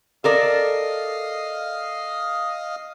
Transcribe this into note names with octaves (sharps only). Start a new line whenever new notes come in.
A4 A#4 D5 D#5 F5